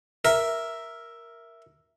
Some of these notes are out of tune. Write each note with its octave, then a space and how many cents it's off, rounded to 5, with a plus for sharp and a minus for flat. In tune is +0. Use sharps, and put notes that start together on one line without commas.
A#4 +0 E5 +0